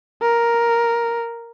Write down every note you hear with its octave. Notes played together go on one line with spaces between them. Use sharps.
A#4